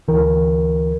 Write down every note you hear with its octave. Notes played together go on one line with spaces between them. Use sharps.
D2 E3 A#4